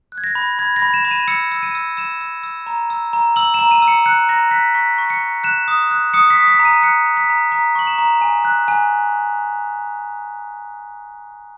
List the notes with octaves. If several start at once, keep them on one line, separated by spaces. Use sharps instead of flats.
F#6
G#6
A#6
B5
B5 G#6
A#6
B5
E7
B5
D#7
E6 C#7
E6
D#7
E6
E6 E7
E6
E6
A#5
E6
A#5
E6 F#7
A#5 E7
D#7
E6
C#7
F#6 C#7
A#5 A#6
F#6 B6
C#6 B6
C#6
C#7
A#5
F#6 E7
D#6
F#6
D#6 C#7
B6
D#6
B6
A#5
D#7
F#6 C#7
A#5
B6
A#5
A#5 B6
C#6 F#7
E7
A#5
G#5
F#6
G#5